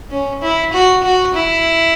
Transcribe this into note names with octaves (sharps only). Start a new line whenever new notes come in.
C#4
E4
F#4
F#4
E4